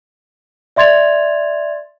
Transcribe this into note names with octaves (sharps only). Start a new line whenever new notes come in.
D5 E5 C6 G#6 A6 F7